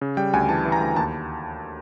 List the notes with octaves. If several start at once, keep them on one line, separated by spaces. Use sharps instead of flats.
C#3
G3 G5
D2 G#5
E3 A5
E3
A#5
D2
D#2 A5